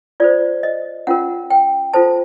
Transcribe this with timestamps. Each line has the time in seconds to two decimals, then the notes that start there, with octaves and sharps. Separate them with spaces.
0.20 F4 A4 C5 D5
0.63 D#5
1.07 C#4 F4 A#4 F#5
1.50 G5
1.94 F4 A4 C5 A5